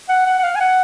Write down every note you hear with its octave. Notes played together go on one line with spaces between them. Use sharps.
F#5
F#5
F#5
F5
G#5
F#5